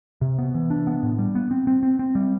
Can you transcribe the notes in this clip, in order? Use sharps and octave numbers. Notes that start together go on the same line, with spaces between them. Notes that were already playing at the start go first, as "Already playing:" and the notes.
C3
B3
E3
D4
B3
A2
G3
B3
C4
C4
C4
C4
G3